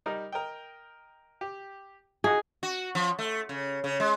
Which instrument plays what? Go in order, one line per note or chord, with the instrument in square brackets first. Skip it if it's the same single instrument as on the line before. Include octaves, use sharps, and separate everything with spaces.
[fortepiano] G3 D#4 A#4
A#4 D#5 G5
G4
[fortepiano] D#4 F#4 [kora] G#4
[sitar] F#4
F3
A3
C#3
C#3
G#3